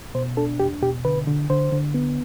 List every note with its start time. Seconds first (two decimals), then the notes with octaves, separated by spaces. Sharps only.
0.15 B2 C5
0.37 D4 A4
0.60 E2 G4
0.82 B2 G4
1.05 D3 B4
1.27 D3
1.50 D3 C5
1.72 D3
1.94 B3